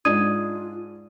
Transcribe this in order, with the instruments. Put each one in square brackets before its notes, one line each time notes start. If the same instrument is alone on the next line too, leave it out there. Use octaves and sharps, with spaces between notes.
[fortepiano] G#2 D4 [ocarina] F4 [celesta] D#6 G#6 D#7